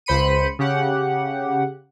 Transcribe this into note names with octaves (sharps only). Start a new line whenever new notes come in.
C#2 C5 B5 C#7 D#7
C#3 G4 F#5